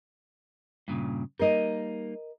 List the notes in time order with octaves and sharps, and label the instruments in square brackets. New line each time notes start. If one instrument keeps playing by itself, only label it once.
[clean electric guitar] G2 A#2 C#3
[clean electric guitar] G3 A#3 D#4 [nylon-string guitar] A#4 D#5